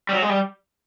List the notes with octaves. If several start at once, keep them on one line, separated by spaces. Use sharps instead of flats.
G3
F#3
G#3
G3